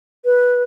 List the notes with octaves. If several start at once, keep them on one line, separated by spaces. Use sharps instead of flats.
B4